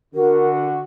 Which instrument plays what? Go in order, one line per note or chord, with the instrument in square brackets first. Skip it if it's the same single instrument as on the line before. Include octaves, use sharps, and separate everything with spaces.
[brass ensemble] D3 F#4 [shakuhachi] A#4